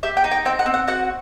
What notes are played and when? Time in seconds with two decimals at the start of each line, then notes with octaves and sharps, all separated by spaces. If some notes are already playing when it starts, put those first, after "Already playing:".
0.03 G4 E5
0.17 G5
0.24 D#4
0.31 G5
0.45 C4 G5
0.59 F#5
0.66 C4
0.74 F#5
0.88 F#4 F#5